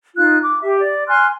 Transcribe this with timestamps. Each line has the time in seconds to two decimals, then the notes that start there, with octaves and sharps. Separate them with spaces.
0.15 D#4 F4 F#6
0.42 D6
0.61 G4 E5
0.81 D5
1.08 G#5 C6 F6 F#6